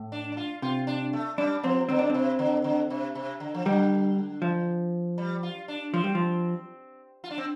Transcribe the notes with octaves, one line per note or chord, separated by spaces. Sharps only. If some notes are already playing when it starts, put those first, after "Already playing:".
Already playing: A2
D4
D4
F4
C3 F4
D4
A3
G3 D4
F3 C4
D3 C4
D4
C3 C4
D3
D3
C3
C3
D3
F3
D3 G3
F3
G3
F4
D4
F3 C4
G3
F3
F4
D4
C4